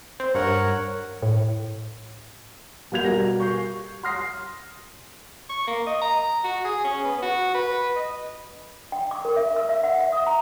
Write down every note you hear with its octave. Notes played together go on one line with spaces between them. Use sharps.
C4
G2 A#4 C#5 F#5
A2
B2 G3 A#3 G6 G#6 F7
B2 G3 A#4 A#6
C#6 G6 C7
C6 D#6 F6 A#6 C7
C#6
A#3
D#5
A#5
F#4
G#4
C#4
B3
F#4
B4
D#5
G5
D6
A#4
E5
E6
E5
F#5
E5
D#6
A#5